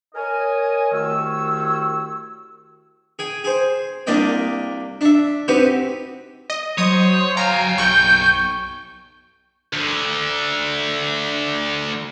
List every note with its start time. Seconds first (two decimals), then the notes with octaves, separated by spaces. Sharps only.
0.15 A#4 C#5 D#5 G#5
0.92 C2 D#3 A3 F#4 C#5 E6
3.19 G#4 G5
3.44 G#4 C5
4.07 C2 A#3 D4 D5 D#5 G5
5.01 D4 E5
5.48 C4 D#4 F#4 G4 B4 C5
6.50 D#5
6.78 F#3 C5 C#5 D#6
7.37 F5 G5 G#5 A#5
7.78 B1 C#6 G6
9.73 D2 D3